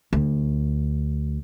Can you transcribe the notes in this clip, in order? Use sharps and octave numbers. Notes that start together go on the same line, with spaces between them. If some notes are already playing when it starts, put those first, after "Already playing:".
D2